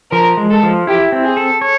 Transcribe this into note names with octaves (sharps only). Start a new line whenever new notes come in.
F3 A#4
G#3
A4
F3
E4 G4
C4
G#4
A4
C#5